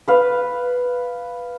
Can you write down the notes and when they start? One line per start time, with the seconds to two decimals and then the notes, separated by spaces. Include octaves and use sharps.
0.08 B4 F5